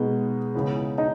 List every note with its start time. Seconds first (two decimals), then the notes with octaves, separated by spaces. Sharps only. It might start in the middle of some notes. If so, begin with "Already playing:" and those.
Already playing: B2 G#3 B3 D#4
0.55 C#2 C#3 E3 B3
0.98 D#4 D#5